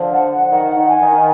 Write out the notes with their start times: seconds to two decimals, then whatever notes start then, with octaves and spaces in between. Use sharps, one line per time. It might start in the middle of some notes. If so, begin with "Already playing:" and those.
Already playing: D3 F3
0.13 F#5
0.51 D#3 F#5
0.76 D#3
0.89 G#5
1.02 D#3